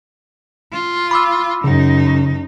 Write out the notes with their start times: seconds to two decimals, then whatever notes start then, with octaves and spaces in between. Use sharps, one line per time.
0.72 F4
1.11 B5 D6 E6
1.64 F#2 C#3 D#4